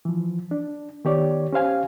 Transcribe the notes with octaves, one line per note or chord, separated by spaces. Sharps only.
E3 F3
D4
D#3 B3 G4 C#5 D5
C#4 G4 C5 F5 G#5